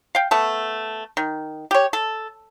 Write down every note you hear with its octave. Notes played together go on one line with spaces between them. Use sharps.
F5 G5
A3 B3 A4 A5
D#3
G4 C#5
A4